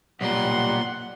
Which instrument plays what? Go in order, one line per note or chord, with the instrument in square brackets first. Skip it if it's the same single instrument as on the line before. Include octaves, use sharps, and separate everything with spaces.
[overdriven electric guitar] B1 A#2 [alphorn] G3 [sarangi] F#5 [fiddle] C6